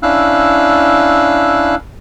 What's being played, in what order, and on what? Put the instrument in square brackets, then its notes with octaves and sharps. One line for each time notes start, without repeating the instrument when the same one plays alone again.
[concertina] C#4 D4 E4 F5 E6 F#6